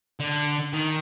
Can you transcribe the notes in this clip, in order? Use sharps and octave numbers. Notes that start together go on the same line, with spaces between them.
D3
D#3